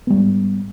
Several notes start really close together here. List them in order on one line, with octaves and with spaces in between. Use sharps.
B3 G3 G#2